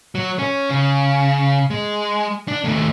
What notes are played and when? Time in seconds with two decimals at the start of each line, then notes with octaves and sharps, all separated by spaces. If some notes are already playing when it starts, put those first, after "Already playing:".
0.15 F#3
0.39 C#4
0.70 C#3
1.70 G#3
2.48 D4
2.64 D#2 A3